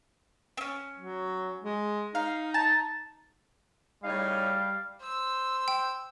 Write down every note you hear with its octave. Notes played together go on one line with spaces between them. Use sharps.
C4 C#4
F#3
G#3
D#4 F5
A5
A2 C#3 G3 D#4 F5
C5 E6
G5